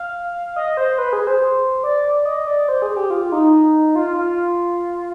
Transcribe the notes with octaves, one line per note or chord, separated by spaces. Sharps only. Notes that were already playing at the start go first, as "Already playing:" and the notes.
Already playing: F5
D#5
C5
B4
G#4
C5
D5
D#5
D5
C5
G#4
G4
F4
D#4
F4
F4